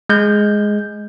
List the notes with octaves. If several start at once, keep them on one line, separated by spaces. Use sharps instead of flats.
G#3 G6